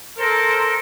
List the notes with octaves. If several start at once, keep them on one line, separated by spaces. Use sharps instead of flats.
A4 A#4 C5